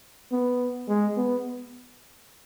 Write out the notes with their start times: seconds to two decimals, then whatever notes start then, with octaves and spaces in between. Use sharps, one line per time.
0.32 B3
0.88 G#3
1.17 B3